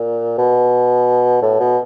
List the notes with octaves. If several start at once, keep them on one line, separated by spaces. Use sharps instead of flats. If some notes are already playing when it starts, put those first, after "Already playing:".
Already playing: A#2
B2
A2
B2